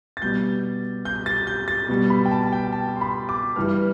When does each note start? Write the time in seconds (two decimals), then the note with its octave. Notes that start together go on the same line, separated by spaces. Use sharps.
0.17 A6
0.22 B2 G3 G6
1.05 G6
1.26 A6
1.47 G6
1.68 A6
1.89 B2 G3
2.10 B5
2.26 G5
2.31 A5
2.52 G5
2.73 A5
2.96 C6
3.01 B5
3.29 D6
3.56 G2 E3 G3 F6